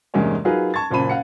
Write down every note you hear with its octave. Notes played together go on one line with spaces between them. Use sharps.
E2 G2 C3 G#3 A#3 C#4
F#3 D#4 F4 G#4 A#4 B4
A5 C#6 G#6 A6
F#1 A#2 C5 A5 B5 D#7
F5 F#5 C#7